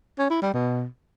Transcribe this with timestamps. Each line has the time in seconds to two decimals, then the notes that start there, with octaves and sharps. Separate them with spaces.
0.18 C#4
0.30 E4
0.42 G3
0.54 B2